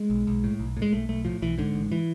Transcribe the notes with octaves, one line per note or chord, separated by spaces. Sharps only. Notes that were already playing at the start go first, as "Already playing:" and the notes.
Already playing: G#3
B1
B1
A2
B1
A2
G#3
B1 A3
B1 A3
A2 F3
B1 E3
G#2 D3
A1
E3